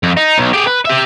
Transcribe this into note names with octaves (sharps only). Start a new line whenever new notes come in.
F2
D#4
B1
G4 G#4
B4
G4 E5